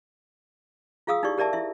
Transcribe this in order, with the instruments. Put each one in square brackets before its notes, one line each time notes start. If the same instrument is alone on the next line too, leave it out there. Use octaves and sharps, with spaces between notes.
[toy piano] F4 G#4 F5 D#6 E6
D#4 E4 G4 D5 C#6
G4 A#4 D5 E5 A5
E4 E5